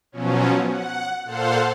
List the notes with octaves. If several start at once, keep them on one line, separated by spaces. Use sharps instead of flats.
B2 F3 F#3 C#4
F#5
A#2 A4 C5 F5 F#5 C6